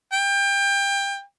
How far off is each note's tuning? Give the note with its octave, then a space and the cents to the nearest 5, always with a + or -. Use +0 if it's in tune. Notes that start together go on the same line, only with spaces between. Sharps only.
G5 +25